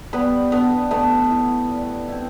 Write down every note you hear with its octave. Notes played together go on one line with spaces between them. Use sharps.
G3 B3 B4
B3 D4 B4
A3 B3 B4
E4
G3
C4 E4